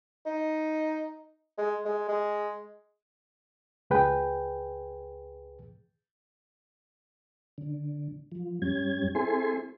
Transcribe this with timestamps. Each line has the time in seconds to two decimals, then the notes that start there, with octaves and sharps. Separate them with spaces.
0.26 D#4
1.58 G#3
1.85 G#3
2.08 G#3
3.90 C#2 G#4 B4 G5
7.58 D3
8.32 F3
8.62 G2 G3 C#4 G#6
9.15 C4 E4 G#4 A4 G#5 C6